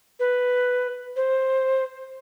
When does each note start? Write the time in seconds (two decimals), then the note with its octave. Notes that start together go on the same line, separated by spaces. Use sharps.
0.20 B4
1.16 C5